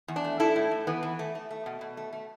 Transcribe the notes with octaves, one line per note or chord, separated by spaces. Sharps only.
E2
D4
A3
A2 E4 A4
A2
A2
E3 B3
E3
A3
A3
A3
B2
B2
A3
A3